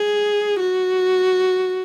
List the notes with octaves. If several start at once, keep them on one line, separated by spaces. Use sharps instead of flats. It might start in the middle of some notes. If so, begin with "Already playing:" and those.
Already playing: G#4
F#4